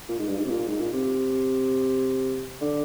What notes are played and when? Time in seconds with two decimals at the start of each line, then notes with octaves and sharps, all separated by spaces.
0.09 A#2
0.19 G#2
0.28 G2
0.38 G#2
0.46 C3
0.51 A#2
0.68 G#2
0.80 A#2
0.93 C3
2.61 D3